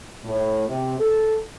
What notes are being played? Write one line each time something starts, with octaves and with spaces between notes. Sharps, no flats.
A2
C3
A4